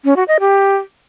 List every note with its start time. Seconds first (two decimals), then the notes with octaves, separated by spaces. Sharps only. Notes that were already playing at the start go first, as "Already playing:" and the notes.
0.05 C#4
0.16 F#4
0.28 D#5
0.40 G4